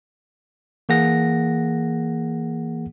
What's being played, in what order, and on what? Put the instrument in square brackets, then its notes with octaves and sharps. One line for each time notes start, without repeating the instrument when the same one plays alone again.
[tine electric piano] E3 A#3 G#4 F#5 A#6